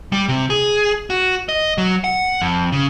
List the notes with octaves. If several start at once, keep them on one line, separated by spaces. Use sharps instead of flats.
G3
C3
G#4
F#4
D#5
F#3
F#5
F2
C#3